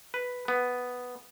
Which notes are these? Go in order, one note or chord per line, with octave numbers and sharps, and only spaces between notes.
B4
B3